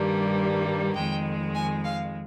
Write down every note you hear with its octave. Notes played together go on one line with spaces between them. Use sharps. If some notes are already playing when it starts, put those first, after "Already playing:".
Already playing: G2 D#3 G3 A#3
F2 D#3 G#3 G5
G#5
F5